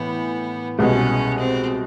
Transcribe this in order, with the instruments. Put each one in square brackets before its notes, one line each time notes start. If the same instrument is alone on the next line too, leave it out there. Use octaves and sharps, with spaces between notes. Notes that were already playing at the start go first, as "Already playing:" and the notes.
Already playing: [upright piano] A2 E3 [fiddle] B3
[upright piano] C2 B2 G#3 [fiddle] C#4
[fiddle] C4